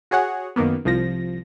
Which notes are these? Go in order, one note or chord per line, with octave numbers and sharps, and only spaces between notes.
F#4 G#4 C#5 F#5
F#2 D#3 A#3 B3
C2 F3 A#6